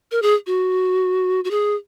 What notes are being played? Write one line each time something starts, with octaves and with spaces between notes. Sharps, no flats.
A#4
G#4
F#4
F#4
G#4